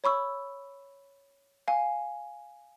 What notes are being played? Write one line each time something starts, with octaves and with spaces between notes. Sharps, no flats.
C#5 B5 C#6 E6
F5 G#5